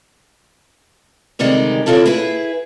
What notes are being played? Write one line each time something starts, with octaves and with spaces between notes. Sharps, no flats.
D2 C3 D#3 G3 G#3 D#4
C#3 C4 E4 F4 A4
E4 G#4 B4